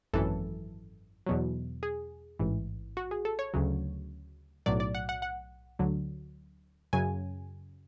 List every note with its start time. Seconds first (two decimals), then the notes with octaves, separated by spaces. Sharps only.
0.13 G#1 F#2 E3 A4
1.26 E2 B2 F#3
1.83 G#4
2.39 A1 G#2 E3
2.97 F#4
3.11 G#4
3.25 A4
3.39 C#5
3.54 D2 C#3 F#3
4.66 B1 A2 F#3 D5
4.80 D5
4.95 F#5
5.09 F#5
5.22 F#5
5.79 D2 D3 F#3
6.93 F#2 C#3 F#3 G#5